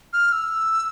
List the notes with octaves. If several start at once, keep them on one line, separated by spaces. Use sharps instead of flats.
F6
E6